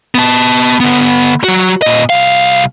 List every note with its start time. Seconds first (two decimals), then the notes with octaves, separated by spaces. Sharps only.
0.15 B3 A5
0.80 D3 B3
1.44 F#3 F#4
1.82 A#2 D#5
2.10 C2 F5